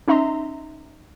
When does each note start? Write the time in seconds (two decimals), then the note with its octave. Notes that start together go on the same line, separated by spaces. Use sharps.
0.08 C#4 D#4 E5 A#5 C6